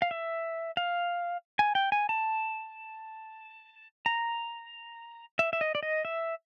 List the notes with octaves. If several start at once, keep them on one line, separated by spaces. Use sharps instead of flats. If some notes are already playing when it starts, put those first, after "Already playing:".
F5
E5
F5
G#5
G5
G#5
A5
A#5
E5
E5
D#5
D5
D#5
E5